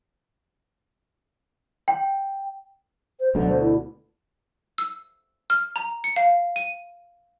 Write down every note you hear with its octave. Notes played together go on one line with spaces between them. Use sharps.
G5
C5
D2 B2 D3 F#3
C5
E4
E6
F6
A#5
C#7
F5
D#7